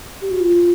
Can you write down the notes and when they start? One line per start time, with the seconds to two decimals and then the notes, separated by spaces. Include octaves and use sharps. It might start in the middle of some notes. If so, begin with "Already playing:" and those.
0.21 G4
0.31 F#4
0.40 F4